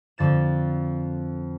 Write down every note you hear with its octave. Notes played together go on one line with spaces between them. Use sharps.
F2 D3 A6 E7